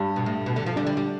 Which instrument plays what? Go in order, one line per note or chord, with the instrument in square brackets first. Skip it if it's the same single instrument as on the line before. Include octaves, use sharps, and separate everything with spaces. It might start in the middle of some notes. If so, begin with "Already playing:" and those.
Already playing: [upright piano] G2 G3
[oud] B2
A2
B2
D3
F3
[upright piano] D3 D4 [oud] G3
[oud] G3
G3